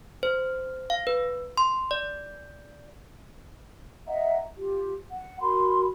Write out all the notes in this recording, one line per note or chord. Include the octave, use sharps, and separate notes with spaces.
C5
F5
B4
C6
D5
D#5 E5 F#5 A#5
F4 G4
F#5
F#4 A#4 B5 C6